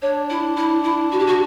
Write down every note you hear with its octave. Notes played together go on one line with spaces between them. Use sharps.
D4 C#5
E4
E4
E4
F#4
G4
F#4